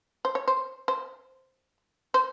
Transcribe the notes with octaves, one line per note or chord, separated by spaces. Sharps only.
C5
C#5
C5
C5
C5